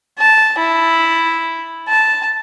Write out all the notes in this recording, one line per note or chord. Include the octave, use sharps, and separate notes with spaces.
A5
E4
A5